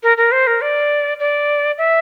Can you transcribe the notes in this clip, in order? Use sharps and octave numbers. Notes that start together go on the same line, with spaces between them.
A#4
A#4
C5
A#4
D5
D5
E5